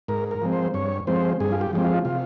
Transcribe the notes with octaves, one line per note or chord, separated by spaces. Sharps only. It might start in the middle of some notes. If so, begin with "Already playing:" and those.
G#2 A#4
A#4
F3 G#3 C4
C5
G2 C#5
F3 G#3 C4 C5
G2 G#4
F4
G4
F3 G#3 C4 G4
F4
C3 F4